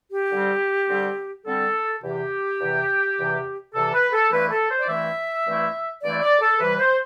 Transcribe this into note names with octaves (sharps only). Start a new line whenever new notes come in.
G4
D3 G3 C4
D3 G3 C4
D3 G3 C4 A4
E2 C3 E3 G4
E2 C3 E3
E2 C3 E3
E2 C3 E3 A4
B4
A4
G2 E3 A3 C4 E4 B4
A4
C5
D5
G2 E3 A3 C4 E4 E5
G2 E3 A3 C4 E4
G2 E3 A3 C4 E4 D5
D5
A4
C3 E3 G3 B4
C5